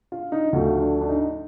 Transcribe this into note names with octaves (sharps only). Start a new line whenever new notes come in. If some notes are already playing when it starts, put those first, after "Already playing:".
F4
D#4
D2 D3 F3 A3 F4
D4
D4
D#4